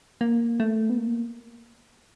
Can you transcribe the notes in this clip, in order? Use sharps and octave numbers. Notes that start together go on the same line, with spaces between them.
A#3
A3
B3
A#3